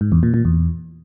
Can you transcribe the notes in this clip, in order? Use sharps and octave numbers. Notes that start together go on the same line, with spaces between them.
G#2
E2
A#2
A#2
E2